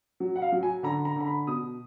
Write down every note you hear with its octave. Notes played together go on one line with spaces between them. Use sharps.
F#3
F#5
F5
F#3
G#5
D3 A#5
A#5
D3 A#5
B5
B2 D#6